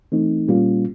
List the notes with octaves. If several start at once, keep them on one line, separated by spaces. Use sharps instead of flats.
E3 A3 C4 D#4
A#2 G3 A#3 C#4 F4